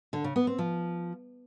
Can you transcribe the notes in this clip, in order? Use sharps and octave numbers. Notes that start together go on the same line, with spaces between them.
D3
C#3
B3
C4
F3